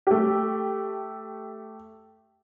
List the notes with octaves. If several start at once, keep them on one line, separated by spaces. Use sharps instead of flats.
A3 G4